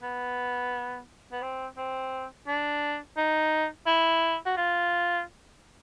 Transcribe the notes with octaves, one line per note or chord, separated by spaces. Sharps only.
B3
B3
C4
C4
D4
D#4
E4
F#4
F4